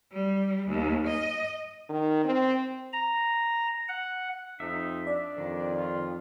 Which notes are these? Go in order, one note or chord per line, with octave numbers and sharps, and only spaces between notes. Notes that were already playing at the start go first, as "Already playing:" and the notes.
G3
D#2
D#5
D#3
C4
A#5
F#5
F2 D#4 E5
D4 D5
F2 D#3
F4